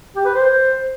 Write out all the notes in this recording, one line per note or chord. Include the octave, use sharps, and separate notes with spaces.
G4
B4
C5